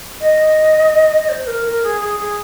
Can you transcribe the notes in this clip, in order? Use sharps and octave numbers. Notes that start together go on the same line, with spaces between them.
D#5
D#5
C5
A#4
A#4
G#4
G#4
G#4